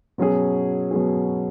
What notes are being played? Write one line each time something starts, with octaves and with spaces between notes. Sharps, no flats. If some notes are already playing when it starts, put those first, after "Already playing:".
B2 F#3 C#4 G#4
B2 F#3 C#4 G#4